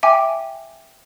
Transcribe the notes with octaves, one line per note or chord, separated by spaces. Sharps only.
E5 G5 G#5 D6